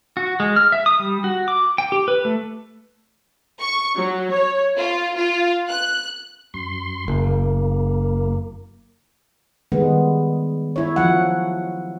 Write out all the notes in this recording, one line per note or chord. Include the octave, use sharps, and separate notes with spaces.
F#4
G#3
F6
E5
D#6
G3
F#4
D6
G5
G4
B4
A3
C#6
F#3
C#5
F4
F4
F#6
F#2 C6
F#1 A#3
D#3 G3 G#3 B3
E4 C#5
F3 F#3 F#5